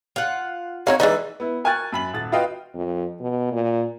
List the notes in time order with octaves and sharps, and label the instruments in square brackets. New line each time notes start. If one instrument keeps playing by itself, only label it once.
[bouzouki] F4 F#5
[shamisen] C4 D#4 F5 [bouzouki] F#4 [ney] C#5
[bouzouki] E3 B4 [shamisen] G#3 D#4 [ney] D5
[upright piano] B3 E4
A#4 G#5 C#6 F6 F#6 A6
F#2 B5 F#7
D#1 A6
F4 F#4 B4 D#5 F5 G5
[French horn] F2
B2
A#2